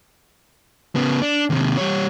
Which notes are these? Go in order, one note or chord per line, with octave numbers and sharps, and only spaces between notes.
C#3 B3
D4
D#2 C3
G3 C#5